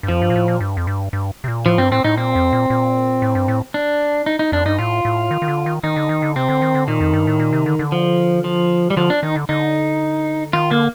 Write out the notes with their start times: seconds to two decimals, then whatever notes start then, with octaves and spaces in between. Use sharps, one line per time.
0.03 G2
0.08 F2 F3
0.22 G2
0.30 A#2
0.36 A2
0.48 A#2
0.61 G2
0.77 F2
0.87 G2
1.13 G2
1.44 C3
1.48 A#2
1.66 A2 F3
1.78 G2 C4
1.91 A2 C4
2.04 A2 D#4
2.18 A#2 C4
2.35 F2
2.53 A#2
2.70 A#2
3.22 A2
3.35 G2
3.48 A2
3.74 D4
4.26 D#4
4.39 D#4
4.52 F2 D4
4.66 G2 D#4
4.79 A2 F4
5.05 A2
5.31 D#3
5.42 D#3
5.48 D3
5.66 D#3
5.83 D#3 D#4
5.96 D3
6.09 D#3
6.22 D3
6.36 C3 C4
6.49 D3
6.62 D#3
6.75 D3
6.88 A#2 D#3
7.01 F2
7.14 G2
7.27 A2
7.40 A#2
7.53 C3
7.66 D3
7.79 D3
7.92 F3
8.44 F3
8.90 G3
8.96 D3 F3
9.10 D4
9.23 D#3 D#4
9.36 D3
9.49 D3 D#4
10.53 D#3 F4
10.71 D3 A#3